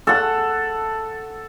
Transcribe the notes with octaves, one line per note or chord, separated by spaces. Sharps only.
A4 F#5